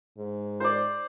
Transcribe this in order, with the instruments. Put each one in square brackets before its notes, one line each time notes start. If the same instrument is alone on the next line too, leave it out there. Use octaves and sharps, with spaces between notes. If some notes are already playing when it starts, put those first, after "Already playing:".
[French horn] G#2
[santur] C5 D5